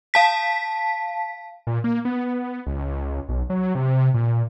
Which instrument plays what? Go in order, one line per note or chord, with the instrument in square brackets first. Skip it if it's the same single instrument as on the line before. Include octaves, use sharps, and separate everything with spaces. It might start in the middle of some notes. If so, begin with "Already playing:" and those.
[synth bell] F5 A5 B6
[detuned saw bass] A#2
A#3
B3
C#2
B1
F#3
C3
A#2